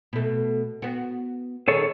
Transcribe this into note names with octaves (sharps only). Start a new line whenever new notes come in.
B2 A3
B3 F#4
D#3 G#4 A4 C#5